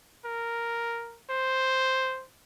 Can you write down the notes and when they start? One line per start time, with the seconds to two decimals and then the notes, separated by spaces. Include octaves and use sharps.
0.25 A#4
1.30 C5